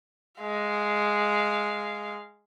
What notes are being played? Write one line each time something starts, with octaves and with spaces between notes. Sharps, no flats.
G#3 F5